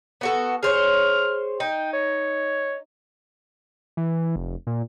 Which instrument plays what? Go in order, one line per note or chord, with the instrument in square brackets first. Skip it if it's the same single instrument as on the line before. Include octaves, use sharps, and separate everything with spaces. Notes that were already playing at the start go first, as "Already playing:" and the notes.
[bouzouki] B3 F#4 A4
[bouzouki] G#4 C5 C#5 [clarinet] F6
[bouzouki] D#4 [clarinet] G5
[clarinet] C#5
[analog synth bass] E3
F1
A#2